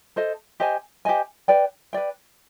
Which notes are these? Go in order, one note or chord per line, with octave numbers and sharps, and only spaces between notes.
A4 C5 D#5
G4 C5 D#5 G#5
G4 C5 D#5 G#5
B4 D5 G5
B4 D5 G5